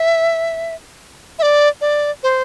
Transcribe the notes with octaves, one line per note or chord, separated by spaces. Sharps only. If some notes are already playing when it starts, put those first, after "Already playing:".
Already playing: E5
E5
D5
D5
C5